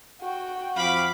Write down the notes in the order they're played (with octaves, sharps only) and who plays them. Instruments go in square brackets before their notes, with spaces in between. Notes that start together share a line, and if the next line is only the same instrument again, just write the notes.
[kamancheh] F#4 G5
[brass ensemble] F2 F3 F5 [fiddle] B5 D6